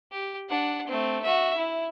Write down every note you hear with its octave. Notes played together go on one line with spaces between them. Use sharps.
G4
D4 F#5
A3 C4
F#4 E5
E4